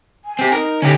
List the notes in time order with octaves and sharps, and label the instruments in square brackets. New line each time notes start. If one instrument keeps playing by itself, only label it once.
[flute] G#5
[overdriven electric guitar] C4 G4
[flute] D#4 [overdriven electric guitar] A#4
[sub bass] D3 [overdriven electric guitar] C#4 G4